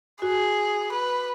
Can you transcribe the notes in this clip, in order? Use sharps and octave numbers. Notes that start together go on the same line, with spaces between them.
F#4 G#4
B4